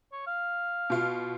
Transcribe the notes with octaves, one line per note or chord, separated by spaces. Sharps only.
C#5
F5
B2 F4